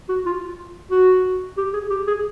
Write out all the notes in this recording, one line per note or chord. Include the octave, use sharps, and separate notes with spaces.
F#4
F4
F#4
G4
G#4
G4
G#4